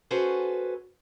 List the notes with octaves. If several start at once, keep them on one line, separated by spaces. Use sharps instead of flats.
C#4 F#4 G#4 A4 B4 C5